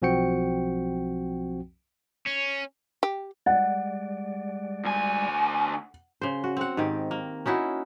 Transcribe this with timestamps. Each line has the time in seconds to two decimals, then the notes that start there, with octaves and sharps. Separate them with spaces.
0.02 B1 F3 C4 F#4 G5 C#7
2.26 C#4
3.03 G4
3.46 G3 G#3 D5 F#5
4.85 D2 G#5
6.22 C#3 C5
6.44 F#4
6.57 C4 F#5
6.77 G#2 D#3 G4
7.11 A#3
7.46 C#4 D#4 E4 F#4